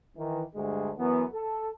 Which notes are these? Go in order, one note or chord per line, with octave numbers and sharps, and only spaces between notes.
D#3 E3
D2 G2 D3 G#3
F#2 E3 B3
A4